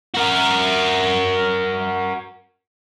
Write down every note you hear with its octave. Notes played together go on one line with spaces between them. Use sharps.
F#4 A#4